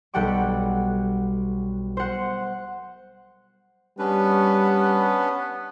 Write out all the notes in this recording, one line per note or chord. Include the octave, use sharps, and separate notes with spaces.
B1 G3 A4 F#5 G5 D6
C5 F#5
G3 B3 C#4 D4 B4